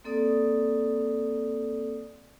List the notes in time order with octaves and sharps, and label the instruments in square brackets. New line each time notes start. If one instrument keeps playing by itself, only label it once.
[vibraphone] A#3 C4 A4 D5 D#6